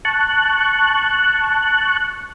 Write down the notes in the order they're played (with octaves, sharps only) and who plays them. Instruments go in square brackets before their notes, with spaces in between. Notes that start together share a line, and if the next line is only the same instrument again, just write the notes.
[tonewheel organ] A5 C#6 F#6